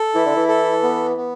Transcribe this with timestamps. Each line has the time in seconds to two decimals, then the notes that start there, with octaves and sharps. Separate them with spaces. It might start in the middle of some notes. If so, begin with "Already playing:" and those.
Already playing: A4
0.15 E3 E4
0.26 D3
0.36 E3
0.48 A4
0.83 B3
1.17 B3